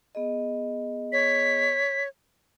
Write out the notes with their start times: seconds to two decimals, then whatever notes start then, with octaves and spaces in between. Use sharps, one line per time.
0.15 B3 G#4 D#5
1.12 C#5 B6